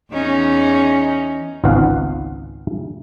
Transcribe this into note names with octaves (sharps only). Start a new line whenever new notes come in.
E2 C#4 D#4
G#1 C#2 G#2 B3 F5 F#5